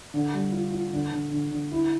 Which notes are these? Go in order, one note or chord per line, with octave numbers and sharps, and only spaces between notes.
D3
G3
F4
F4
D3
D3
D3
D3
E4